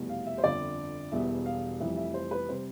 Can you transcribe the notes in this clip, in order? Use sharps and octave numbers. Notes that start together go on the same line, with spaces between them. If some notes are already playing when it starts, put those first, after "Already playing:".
Already playing: F1 E2 B2 G3
F5
E5
C5
G1 F2 D3 D5
E1 E2 B2 G3 E5
F5
F1 F2 E3 G3 E5
E5
C5
B4
C3 G3 C5